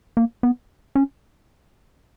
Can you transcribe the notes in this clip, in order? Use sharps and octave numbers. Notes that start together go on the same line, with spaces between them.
A#3
B3
C#4